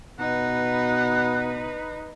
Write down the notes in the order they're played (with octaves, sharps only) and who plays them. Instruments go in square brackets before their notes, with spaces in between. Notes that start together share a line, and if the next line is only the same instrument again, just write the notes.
[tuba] B2 [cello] D#4 [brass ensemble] B4 [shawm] F#5